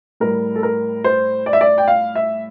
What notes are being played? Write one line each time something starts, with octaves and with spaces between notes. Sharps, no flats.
A2 G3 A#4
A4
A#4
C5
D5
E5
D5
G5
F5
E5